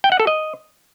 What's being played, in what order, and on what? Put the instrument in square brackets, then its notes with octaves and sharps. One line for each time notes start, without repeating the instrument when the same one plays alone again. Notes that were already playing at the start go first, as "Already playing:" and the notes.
[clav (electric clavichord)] G5
F#5
A4
D#5